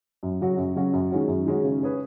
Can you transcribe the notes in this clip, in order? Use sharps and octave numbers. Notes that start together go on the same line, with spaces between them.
F#2
C#3 F#3 C#4 F#4
F#2
C#3 F#3 C#4 F#4
F#2
D#3 G#3 C#4 F#4
F#2
D#3 G#3 C#4 F#4
C#3
G#3 C#4 G#4 B4